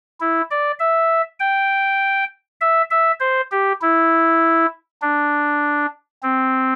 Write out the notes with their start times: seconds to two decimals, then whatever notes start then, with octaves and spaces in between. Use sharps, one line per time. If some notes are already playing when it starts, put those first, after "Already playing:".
0.20 E4
0.50 D5
0.79 E5
1.40 G5
2.61 E5
2.90 E5
3.20 C5
3.52 G4
3.82 E4
5.02 D4
6.23 C4